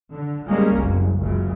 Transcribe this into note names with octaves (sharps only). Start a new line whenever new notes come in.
D3
G3 G#3 A#3 C#4
F#1 C2
F#1 C#2 C#3